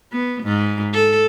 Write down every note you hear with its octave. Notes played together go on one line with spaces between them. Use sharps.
B3
G#2
A4